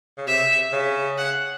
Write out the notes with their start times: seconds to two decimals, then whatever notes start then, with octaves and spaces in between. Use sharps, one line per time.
0.18 C#3
0.27 C3 E5
0.72 C#3
1.18 F#5